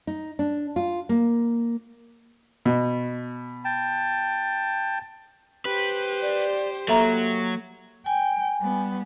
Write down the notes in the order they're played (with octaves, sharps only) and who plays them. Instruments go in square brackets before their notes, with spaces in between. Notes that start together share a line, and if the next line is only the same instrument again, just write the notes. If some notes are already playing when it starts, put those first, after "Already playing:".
[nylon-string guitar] D#4
D4
F4
A#3
[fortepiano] B2
[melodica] G5 A5
[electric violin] G4 C5 [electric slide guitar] B4
[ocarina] D5
[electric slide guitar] F#3 [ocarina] A#3 [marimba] A4 E5 A#5
[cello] G5 [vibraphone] G#5
[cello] G3 B3